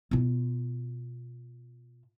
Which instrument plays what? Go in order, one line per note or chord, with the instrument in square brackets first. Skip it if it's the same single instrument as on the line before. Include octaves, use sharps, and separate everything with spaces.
[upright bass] B2 F4